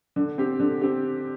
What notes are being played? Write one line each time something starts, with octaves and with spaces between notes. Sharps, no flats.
D3
C4 G4
D3
C4 G4